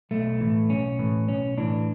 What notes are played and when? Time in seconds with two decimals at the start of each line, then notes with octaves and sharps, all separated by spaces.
0.11 B1 A3
0.40 A2 E3
0.70 B1 C#4
0.99 A2 E3
1.28 B1 C#4
1.57 A2 E3 D4